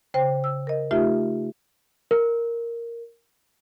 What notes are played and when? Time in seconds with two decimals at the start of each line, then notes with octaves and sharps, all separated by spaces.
0.14 C#3 C5 G5
0.44 E6
0.67 A#4 D#5
0.91 A3 D#4 F4 G4 E5
2.11 A#4